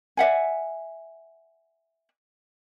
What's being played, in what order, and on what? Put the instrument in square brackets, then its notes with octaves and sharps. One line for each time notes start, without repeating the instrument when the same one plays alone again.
[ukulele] D5 E5 F#5 G#5